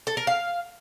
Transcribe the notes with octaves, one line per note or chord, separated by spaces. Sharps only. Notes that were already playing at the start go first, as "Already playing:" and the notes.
A4
A#4
F5